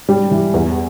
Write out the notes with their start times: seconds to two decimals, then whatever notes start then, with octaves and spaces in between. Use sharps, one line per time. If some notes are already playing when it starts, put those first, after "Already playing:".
0.09 G3
0.31 E3
0.54 E2